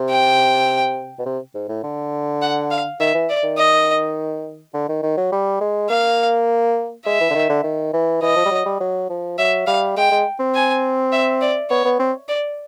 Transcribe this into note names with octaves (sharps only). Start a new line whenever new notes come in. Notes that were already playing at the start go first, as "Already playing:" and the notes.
Already playing: C3
G5
B2
C3
G#2
A2
D3
F#5
F5
D#3 E5
E3
D5
D#3
D#5
D3
D#3
D#3
F#3
G3
G#3
A#3 F5
G#3 E5
E3
D3
D#3
D3
D#3
E3
E3 D#5
F3
G3
F#3
G3
F#3
F3
F#3 E5
G3 F5
G#3 G5
G#3
C4
G#5
E5
D5
B3 C#5
B3
C4
D5